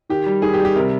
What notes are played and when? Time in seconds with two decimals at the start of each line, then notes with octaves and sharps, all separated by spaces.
0.10 D#3 G4
0.26 G3
0.42 D#3 G#4
0.54 G4
0.59 G3
0.65 G4
0.76 C3 A#4